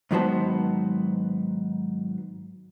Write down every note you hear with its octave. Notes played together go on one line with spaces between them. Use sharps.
G#2 D#3 F#3 B3 C5 A5